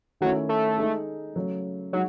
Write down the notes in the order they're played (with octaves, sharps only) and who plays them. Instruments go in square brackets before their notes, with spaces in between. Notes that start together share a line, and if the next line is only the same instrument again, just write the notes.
[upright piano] D#3 A3 C#4 E4 [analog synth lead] F#3
[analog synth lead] A3
[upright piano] G#3 D#4 A4
C#3 F#3 A3
[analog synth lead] F#3 [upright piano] G#3 D#4